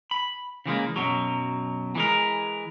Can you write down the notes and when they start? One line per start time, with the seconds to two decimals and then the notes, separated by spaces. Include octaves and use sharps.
0.11 B5
0.66 C#3 E3 G#3 A#3
0.96 F#2 B2 F#3
1.95 E3 G#3 A#4